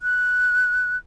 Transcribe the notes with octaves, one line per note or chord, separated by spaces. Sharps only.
F#6